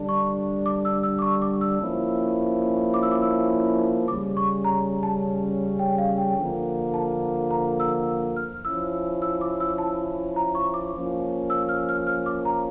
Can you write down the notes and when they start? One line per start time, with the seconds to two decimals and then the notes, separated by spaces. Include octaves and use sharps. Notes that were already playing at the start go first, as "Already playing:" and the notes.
Already playing: D3 G3 D4
0.09 C#6
0.66 D6
0.85 E6
1.03 E6
1.19 D6
1.22 C#6
1.42 D6
1.61 E6
1.80 F3 A#3 C#4 E4
2.94 D6
3.03 E6
3.11 D6
3.22 E6
4.08 C#3 G3 C#4 D6
4.37 C#6
4.65 A#5
5.03 A5
5.79 G5
5.98 F5
6.18 G5
6.37 D3 F3 A#3
6.94 A5
7.51 A#5
7.80 E6
8.36 F6
8.65 F3 C#4 E4 E6
9.22 E6
9.41 D6
9.60 E6
9.78 A5
10.36 A#5
10.55 C#6
10.74 D6
10.93 F3 A#3 C#4
11.50 E6
11.69 F6
11.89 F6
12.07 F6
12.26 D6
12.45 A#5